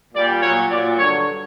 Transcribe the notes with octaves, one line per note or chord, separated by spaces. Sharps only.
A#2 G3 D5
A#2 F#3 C#5
A#2 F#3 D5
G2 D3 F#3 C#5